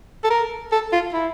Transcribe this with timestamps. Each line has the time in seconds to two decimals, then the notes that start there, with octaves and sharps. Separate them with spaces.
0.24 A4
0.30 A#4
0.72 A4
0.92 F4
1.14 E4